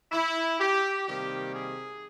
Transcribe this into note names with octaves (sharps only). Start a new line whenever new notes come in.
E4
G4
C3 D#3 G3 A#3 G4
G#4